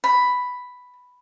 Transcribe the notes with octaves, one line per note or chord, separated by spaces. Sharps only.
B5